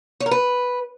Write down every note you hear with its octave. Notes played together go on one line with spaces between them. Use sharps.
C#5
A#4
B4